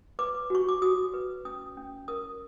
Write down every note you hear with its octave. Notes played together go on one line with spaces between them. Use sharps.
B4 D6
F#4 C#6
D6
F#4 D#6
B4
C#4 D#6
C#4
A#4 D#6